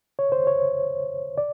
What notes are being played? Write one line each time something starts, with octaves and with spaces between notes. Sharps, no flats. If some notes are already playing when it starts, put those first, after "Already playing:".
C#5
C5
C#5
D5